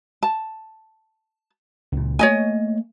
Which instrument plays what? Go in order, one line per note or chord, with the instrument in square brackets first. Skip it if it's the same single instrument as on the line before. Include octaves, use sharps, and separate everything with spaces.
[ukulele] A5
[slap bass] C#2 A#2
[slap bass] A3 A#3 [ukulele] C#5 D#5 G#5